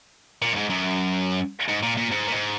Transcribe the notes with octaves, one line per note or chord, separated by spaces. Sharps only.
A#2
F#2
G#2
F#2
G#2
A#2
A#2
G#2
A#2
G#2